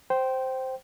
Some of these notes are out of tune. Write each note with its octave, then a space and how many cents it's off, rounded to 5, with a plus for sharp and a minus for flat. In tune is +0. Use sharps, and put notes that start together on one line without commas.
C5 +0 G5 -15